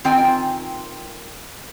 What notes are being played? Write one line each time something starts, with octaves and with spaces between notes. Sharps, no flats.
D#3 C4 F4 G5 G#5